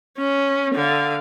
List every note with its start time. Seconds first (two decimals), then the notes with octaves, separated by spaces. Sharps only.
0.18 C#4
0.75 D3 F5